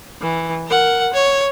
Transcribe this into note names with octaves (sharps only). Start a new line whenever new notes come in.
E3
A#4 F#5
C#5